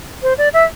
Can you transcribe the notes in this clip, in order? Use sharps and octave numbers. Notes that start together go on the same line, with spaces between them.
C5
D5
E5